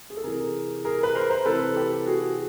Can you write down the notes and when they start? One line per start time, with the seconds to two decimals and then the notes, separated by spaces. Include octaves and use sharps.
0.10 G#4
0.17 A4
0.24 C3 E3 G#4 A#4
0.85 G#4 A#4
1.03 B4
1.15 A#4 C5
1.30 A#4 C5
1.46 C3 E3 A4 B4
1.76 G4 A4
2.06 F#4 G#4